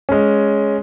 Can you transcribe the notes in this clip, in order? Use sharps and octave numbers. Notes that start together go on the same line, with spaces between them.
G#3 C#4